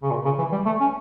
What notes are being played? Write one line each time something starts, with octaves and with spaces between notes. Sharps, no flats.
C#3
A#2
C#3
E3
G3
A3
C#4